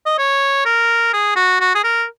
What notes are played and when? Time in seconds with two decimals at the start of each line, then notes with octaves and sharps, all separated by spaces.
0.06 D#5
0.18 C#5
0.65 A#4
1.13 G#4
1.36 F#4
1.60 F#4
1.75 G#4
1.84 A#4